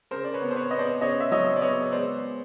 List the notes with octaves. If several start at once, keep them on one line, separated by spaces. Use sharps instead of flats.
C#3 A#4 C5
D5
B4 C#5
B3
C5
B4 C#5
B3 D#5
C5 D5
C#3 C#5 D#5
E5
F#3 C#5 D#5
D5
B3 C#5 D#5
G#3 C5 D5